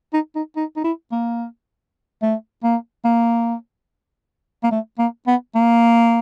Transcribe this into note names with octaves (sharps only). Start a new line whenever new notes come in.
D#4
D#4
D#4
D#4
E4
A#3
A3
A#3
A#3
A#3
A3
A#3
B3
A#3